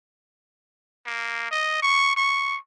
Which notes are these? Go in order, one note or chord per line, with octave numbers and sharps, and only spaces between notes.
A#3
D#5
C#6
C#6